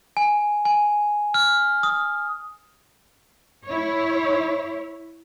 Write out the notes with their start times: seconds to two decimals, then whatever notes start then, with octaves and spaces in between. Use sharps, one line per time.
0.17 G#5
0.65 G#5
1.34 F6
1.83 D#6
3.66 E4 C#5